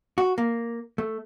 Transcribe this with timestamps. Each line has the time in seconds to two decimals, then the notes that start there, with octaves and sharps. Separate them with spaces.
0.18 F#4
0.38 A#3
0.98 A3